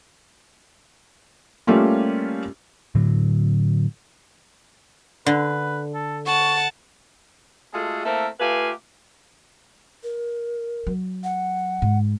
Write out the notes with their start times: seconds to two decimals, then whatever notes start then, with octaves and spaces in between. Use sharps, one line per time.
1.67 G3 A3 A#3 C#4 F4
2.95 A2 D3 F#3
5.26 D3 B4
5.94 A4
6.27 F#5 A5 C#6
7.73 G#3 A3 F4 F#4 G#4 A4
8.05 A3 A#3 C4 E4 A4 A#4
8.40 A3 F4 G4 B4 F5 G#5
10.04 A#4
10.87 F#3
11.24 F#5
11.82 G#2